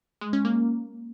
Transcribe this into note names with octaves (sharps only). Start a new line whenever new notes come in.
G#3
C#4
A#3